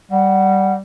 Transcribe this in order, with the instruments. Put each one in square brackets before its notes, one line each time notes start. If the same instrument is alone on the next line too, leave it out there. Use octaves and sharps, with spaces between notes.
[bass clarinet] G3 [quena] F#5